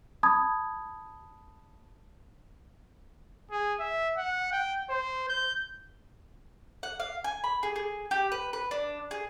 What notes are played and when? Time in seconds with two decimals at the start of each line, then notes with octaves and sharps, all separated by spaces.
0.23 A5 B5 D#6 G#6
3.51 G#4
3.80 E5
4.17 F#5
4.52 G5
4.90 C5
5.29 G6
6.83 F#5
7.00 F5
7.24 G#5
7.44 B5
7.63 G#4
7.76 G#4
8.11 G4
8.32 B4
8.53 B4
8.71 D4
9.11 G#4